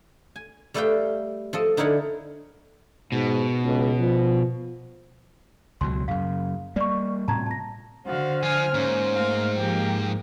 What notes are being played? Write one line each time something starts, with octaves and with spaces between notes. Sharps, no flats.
G#5
G3 A3 A4 B4 F5 G5
F3 A4 D#5
D3 D#4 E4 A#4 C#5 F#5
G#2 B2
C#2
F3
C#2 B2 F#3 C6
F#2 C#3 F5
G3 A#3 D5 C#6
A2 C3 A5 A#5 G#6
A5 A#6
D3 F#4 C5 F5
F3 F4 G#5 F6
G#2 A#3 C#4
A3 A#3 F5
F3 A#3 G4